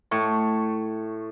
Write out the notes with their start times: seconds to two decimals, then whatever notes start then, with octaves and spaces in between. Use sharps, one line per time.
0.11 A2 C#6